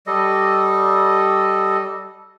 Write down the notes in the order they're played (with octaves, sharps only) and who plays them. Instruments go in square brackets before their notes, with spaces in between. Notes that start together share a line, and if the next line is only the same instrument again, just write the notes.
[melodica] G3 A4 D#5